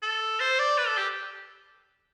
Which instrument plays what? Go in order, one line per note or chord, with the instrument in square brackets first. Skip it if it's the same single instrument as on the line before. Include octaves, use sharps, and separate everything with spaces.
[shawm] A4
C5
D5
B4
A4
G4